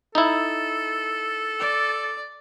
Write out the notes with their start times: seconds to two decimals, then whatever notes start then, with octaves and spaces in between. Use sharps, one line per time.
0.15 D#4 E4 A4
1.60 D5